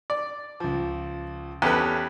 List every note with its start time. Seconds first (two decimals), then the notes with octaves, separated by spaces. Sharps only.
0.10 D5
0.60 C#2 F3
1.62 E2 C#4 G4 A4 B4